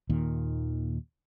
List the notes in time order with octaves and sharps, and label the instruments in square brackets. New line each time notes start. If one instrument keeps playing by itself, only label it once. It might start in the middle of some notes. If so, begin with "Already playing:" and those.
[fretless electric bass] D#2 A#2 D#3